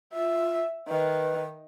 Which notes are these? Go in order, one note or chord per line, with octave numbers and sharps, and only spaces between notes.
F4 E5
D#3 B4